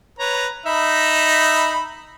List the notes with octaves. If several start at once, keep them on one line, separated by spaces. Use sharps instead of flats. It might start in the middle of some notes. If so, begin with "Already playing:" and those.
B4 C#5 A#5
D#4 E5 B5